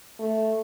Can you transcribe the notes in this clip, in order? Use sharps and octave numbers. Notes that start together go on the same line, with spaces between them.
A3